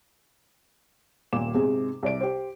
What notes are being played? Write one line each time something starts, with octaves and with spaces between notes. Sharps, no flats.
D#1 A#2 D6 E7
G#2 C3 G#4
C2 D5 D7
G4 C5